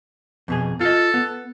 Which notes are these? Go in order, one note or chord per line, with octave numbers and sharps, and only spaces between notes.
F2 B2 G#4
F4 A4 D#5
B3